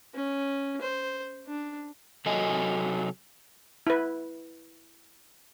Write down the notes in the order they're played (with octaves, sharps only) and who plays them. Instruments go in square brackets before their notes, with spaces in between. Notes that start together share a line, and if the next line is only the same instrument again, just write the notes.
[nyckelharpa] C#4
C5
D4
[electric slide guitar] C3 F#3 A4 D#5 G#5
[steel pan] E4 B4